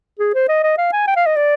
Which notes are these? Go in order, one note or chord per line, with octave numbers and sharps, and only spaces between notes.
G#4
C5
D#5
D#5
F5
G#5
G5
F5
D#5
D5